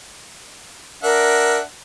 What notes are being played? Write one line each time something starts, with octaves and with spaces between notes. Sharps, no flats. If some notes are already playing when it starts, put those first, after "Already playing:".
D4 A#4 E5 F#5